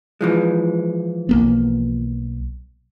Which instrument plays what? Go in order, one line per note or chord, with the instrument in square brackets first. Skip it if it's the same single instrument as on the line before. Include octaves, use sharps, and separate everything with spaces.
[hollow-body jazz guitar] E3 F3 G#3
[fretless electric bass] B1 A#3 B3